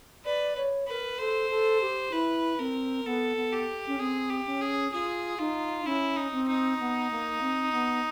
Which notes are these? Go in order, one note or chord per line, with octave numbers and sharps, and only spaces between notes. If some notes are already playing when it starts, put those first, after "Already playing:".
B4 D5
C#5
A#4 B4
A4 C5
A4
G4
E4 B4
C4 A#4
B3 A4
B3
G4
C#4
C4 G#4
G4
C#4
G#4
F4 G#4
D#4 F4
C#4 E4
D#4
C4
D#4
B3
A#3
C4
B3